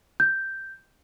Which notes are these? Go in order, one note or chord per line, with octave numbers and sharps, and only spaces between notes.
G6